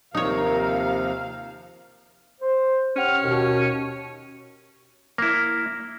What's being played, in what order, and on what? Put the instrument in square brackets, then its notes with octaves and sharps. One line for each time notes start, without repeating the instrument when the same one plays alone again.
[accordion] D#2 C3 F3 [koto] D#4 C#5 [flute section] A#4 [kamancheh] F5
[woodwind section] C5
[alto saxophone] C#4 [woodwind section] G4 F#5 F6
[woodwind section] D#2 B2
[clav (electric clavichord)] A#3 E4